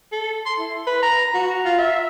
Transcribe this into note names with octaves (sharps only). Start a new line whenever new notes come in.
A4
C6
E4
B4
A#5
F#4
F4
E5